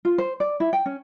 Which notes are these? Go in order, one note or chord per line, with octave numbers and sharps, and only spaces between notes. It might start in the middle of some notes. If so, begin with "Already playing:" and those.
F4
C5
D5
E4
G5
C#4